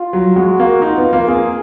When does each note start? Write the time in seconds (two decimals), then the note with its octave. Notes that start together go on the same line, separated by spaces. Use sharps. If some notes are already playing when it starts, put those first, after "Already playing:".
Already playing: F4
0.13 F#3
0.36 G#3 F#4
0.60 A#3
0.82 D#4 F4
0.98 B3
1.13 A#3
1.28 A#3 G#4